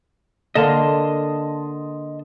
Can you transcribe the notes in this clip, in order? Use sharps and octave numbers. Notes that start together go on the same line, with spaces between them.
D3 A#3 D#5 A5 C6